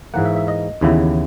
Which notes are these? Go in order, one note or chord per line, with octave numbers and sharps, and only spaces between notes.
G#2 E3 A#3 F#5
E5
E5
D#5
D#2 C#3 E3 B3 E4